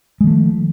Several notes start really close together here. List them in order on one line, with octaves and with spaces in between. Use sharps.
G#3 D#3 A3 F3